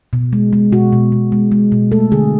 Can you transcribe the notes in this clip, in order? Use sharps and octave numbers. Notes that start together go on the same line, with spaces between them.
B2
G#3
G#3
B2 F#4
B2
B2
G#3
G#3
B2
A3 A4
D3 G#4